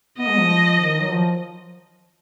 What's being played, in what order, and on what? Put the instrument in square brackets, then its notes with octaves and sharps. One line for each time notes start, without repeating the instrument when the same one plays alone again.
[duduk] B3 [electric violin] D#5
[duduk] G#3
F3
D#3
F#3
F3